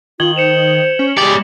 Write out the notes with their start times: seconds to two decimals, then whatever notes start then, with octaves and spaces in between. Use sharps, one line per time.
0.20 D#3 F4 G#6 F#7 G7
0.36 C5 C#7 E7 F7
0.99 C#4
1.18 G#3 G4 D5